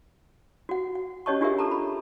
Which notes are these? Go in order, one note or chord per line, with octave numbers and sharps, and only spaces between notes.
F#4 F#5
F#5
C#4 G4 C#5 D#5 A5 C#6
D4 F4 G4 G#4 A#4 E5
A4 A5 A#5
B5